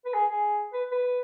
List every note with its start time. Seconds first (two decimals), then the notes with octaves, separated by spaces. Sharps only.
0.05 B4
0.14 G#4
0.30 G#4
0.73 B4
0.92 B4